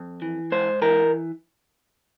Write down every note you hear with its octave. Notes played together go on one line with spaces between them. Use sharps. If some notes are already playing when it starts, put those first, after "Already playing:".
Already playing: F2
E3
G#2 C5
E3 A#4